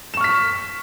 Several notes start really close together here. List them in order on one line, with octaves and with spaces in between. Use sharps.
E7 C#6 F6 B6